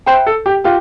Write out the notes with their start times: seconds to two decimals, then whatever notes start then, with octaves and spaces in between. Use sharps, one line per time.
0.06 B4 C5 E5 G5 B5
0.27 A4
0.46 G4
0.64 F4 G4 B4